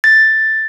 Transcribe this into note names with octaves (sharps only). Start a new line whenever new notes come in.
A6